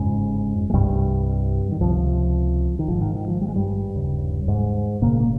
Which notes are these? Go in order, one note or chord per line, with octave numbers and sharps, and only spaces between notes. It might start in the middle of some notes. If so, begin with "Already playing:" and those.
Already playing: G1 F2 G#2 C#3 G#3
G#3
C2 G2 C3 G3
D#3
C#2 C3 F3
D#3
G#1 G#2 F3
D#3
D#3
F3
G3
G#3
G2 G3
F1 D#2 C#3
G#2 G#3
F1 F2 A#2 C#3 A#3
A#3